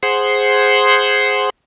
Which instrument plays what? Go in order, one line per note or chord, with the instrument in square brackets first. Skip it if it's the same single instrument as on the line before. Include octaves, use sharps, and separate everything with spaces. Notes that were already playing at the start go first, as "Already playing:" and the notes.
[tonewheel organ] G#4 C5 F#5 C6